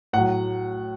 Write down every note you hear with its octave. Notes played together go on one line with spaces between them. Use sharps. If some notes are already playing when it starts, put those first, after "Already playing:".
A2 F#3 F#5